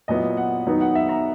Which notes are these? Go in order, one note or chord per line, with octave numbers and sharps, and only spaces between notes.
A#2 F#3 B3 E4 D#5
F#5
D#3 F#3 B3 D#4
F#5
E5
A#5